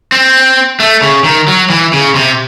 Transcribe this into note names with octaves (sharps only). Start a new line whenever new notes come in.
C4
A3
C#3
D#3
F#3
E3
C#3
C3